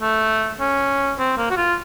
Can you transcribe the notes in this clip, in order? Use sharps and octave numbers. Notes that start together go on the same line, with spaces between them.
A3
C#4
C4
A#3
F#4
F4